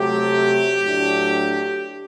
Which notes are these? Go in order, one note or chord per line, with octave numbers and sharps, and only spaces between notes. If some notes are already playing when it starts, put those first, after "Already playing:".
Already playing: C3 F#3 A3 G4
A2 F#3 A3 D4